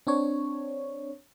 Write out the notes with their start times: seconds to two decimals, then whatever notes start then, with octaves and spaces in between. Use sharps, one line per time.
0.07 C4 D4 C#5